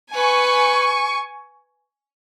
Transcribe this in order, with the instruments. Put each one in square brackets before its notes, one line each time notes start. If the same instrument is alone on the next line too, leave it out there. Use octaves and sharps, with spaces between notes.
[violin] B4 [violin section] G#5 C#6